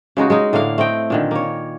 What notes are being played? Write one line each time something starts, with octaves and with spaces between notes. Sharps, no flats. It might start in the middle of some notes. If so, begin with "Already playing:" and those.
C#3 G#3 D#4 F#4
G#3 C#4 D#4
A2 D3 A#3 F5
A3 C4 D#5 G5
A#2 D3 D#3
A#3 C#5